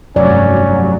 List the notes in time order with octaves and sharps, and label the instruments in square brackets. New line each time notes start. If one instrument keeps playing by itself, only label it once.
[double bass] F1 G2 [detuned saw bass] F#3 [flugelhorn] C#4 [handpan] D5